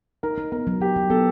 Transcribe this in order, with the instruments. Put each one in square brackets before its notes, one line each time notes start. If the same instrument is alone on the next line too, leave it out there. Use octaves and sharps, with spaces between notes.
[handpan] D#4 [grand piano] A#4
[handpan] D#4
[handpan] B3 [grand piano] A#4
[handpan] F#3
[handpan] F#3 [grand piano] G4
[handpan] F#3
[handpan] B3 [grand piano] A4